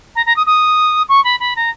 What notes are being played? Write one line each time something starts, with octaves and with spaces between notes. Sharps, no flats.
A#5
A#5
D#6
D#6
C#6
B5
B5
A#5